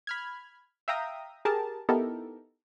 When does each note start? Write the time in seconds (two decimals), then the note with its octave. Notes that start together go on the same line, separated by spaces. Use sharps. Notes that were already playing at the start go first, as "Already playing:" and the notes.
0.07 B5 F6 G#6
0.88 E5 F5 G5 A#5 D#6
1.45 G4 G#4 A#4 A5
1.89 B3 D#4 E4 G4 A4 A#4